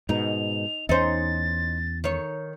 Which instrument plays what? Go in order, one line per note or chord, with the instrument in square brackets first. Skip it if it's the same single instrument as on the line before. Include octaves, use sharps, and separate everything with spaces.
[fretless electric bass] G#2 B2 [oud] D#4 [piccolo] F7
[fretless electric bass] E2 C#4 [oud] D#4 C5 [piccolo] A6
[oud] D#3 C#5